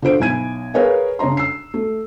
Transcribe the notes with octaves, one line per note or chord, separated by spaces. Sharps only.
D3 F4 C5 D7
B1 E4 G#5 G#6 D#7
G#4 A#4 B4 C#5 F5 G#5
C#3 D4 C#5 A#5 C6
E6 C7
A3